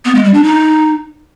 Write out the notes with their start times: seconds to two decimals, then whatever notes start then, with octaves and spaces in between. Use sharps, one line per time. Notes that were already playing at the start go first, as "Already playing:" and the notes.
0.05 B3
0.15 G#3
0.24 G3
0.34 D4
0.44 D#4